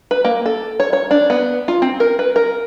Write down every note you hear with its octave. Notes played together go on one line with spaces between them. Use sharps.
B4
A#3
A4
C#5
C#5
D4
B3
F4
C4
A#4
B4
A#4